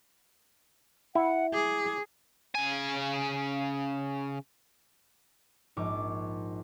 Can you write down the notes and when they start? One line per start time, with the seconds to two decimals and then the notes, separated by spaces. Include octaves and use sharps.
1.15 E4 F#5
1.54 G#4 D6
2.55 C#3 G#5
5.77 A#1 G#2 C#6 D6